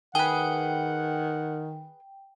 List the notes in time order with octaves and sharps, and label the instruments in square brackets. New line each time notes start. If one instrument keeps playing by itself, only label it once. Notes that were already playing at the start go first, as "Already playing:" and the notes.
[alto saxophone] D#3 [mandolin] G#4 B4 [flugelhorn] F#5 [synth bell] G5